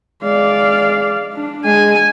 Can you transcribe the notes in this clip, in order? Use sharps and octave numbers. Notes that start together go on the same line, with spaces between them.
G#3 D5 F5
D4
G#3 G#5